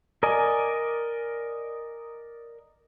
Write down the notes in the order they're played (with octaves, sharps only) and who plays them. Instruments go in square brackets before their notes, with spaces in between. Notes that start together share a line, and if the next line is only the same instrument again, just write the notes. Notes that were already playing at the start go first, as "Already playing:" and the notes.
[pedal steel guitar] A#4 D5 D#5 G#5